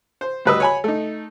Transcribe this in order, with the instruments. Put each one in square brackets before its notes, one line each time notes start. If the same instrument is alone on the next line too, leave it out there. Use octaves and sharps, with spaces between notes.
[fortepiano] C5
D2 G3 B4 D#5 D#6 E6
C#5 G#5 B5
A3 D#4